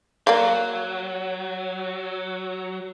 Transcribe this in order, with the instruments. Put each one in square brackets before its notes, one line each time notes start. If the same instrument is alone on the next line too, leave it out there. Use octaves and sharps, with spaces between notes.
[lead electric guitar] F#3 [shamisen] A#3 D5 F5